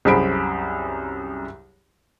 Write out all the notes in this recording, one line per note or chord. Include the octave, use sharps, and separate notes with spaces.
C2 F#2 G#4 C5 B5 D7